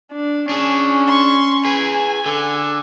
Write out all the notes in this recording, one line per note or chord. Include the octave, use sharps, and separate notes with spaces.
D4
C#4 D4 G#4
C6 C#6
G#4 B4 G#5
D3 A4